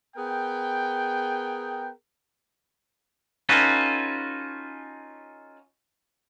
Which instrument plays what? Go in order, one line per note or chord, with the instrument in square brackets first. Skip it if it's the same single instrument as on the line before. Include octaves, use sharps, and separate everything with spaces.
[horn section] B3 G#4 A#4 G5
[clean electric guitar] C#4 D#4 F4 F#4 A4 B4